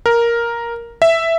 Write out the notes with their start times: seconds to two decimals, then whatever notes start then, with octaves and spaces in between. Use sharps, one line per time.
0.06 A#4
1.02 E5